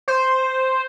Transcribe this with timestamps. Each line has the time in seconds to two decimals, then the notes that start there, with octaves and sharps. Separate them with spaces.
0.08 C5